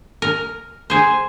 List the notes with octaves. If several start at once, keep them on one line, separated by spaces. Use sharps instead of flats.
A#4
G#4 C5